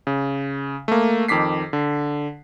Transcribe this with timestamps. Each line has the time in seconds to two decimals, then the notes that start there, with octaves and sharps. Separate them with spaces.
0.07 C#3
0.88 A3 A#3
1.28 F2 D#3 D6 B6 C7
1.73 D3